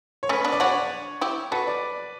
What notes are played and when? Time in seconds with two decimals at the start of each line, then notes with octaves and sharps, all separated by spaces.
0.23 C#5
0.29 A3 C#4 B4
0.44 B3 D4
0.52 D5
0.60 D4 F#4 C#5
1.21 E4 G4
1.51 F#4 A4 B4
1.67 D5